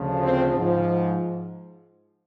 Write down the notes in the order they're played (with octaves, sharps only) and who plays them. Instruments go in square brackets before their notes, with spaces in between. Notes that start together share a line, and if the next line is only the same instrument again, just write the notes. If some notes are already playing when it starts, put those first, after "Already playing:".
Already playing: [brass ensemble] D2 C#3 F3
C4
G#2 F3